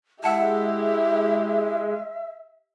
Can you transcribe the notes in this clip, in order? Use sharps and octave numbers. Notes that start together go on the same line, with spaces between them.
G#3 E4 G4 E5 F#5 A5